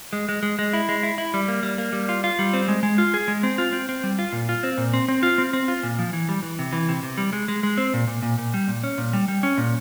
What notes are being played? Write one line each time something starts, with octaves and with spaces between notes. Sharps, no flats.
G#3
G#3
G#3
G#3
E4
G#3
E4
E4
G3
A#3
G3
A#3
G3
F4
F4
G3
C4
G#3
G#3
F4
G#4
G#3
C4
F4
C4
C4
G3
F4
A#2
F4
C4
A#2
C4
C4
F4
C4
C4
F4
A#2
F3
E3
G3
E3
C3
E3
C3
C3
G3
G#3
G#3
G#3
C4
A#2
A#2
A#2
A#2
G3
A#2
C#4
A#2
G3
G3
C#4
A#2